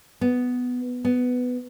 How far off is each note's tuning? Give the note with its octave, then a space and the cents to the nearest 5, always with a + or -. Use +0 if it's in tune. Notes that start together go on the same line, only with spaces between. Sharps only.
B3 +5
B3 +10